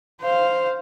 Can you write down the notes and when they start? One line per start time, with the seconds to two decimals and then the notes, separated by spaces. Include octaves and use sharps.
0.21 C5 F5